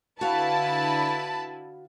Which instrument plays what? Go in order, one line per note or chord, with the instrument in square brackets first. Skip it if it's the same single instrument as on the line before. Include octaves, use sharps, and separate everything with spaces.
[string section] D3 E4 B4 [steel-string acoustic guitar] F#4 F5 [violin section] A5 B5